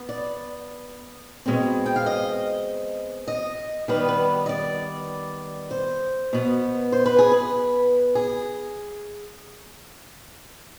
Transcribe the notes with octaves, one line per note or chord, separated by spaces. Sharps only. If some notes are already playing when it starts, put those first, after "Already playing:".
Already playing: B3
D5
B2 G#3 C4
G5
F5
D#5
D#5
D#3 G3 B3 B4
B4
D#5
D5
C5
B2 B3
C5
B4
G#4
B4
G#4